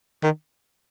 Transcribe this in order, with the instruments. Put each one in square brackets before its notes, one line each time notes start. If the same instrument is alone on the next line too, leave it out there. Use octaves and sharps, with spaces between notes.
[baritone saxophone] D#3